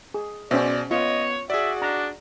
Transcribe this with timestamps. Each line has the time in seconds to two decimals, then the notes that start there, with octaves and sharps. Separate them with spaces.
0.14 G#4
0.51 B2 C#4 C5 D5 E5
0.91 B3 F4 C#5 D#5
1.50 F#4 G#4 D5 E5
1.82 D4 A#5